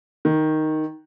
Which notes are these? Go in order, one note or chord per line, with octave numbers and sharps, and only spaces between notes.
D#3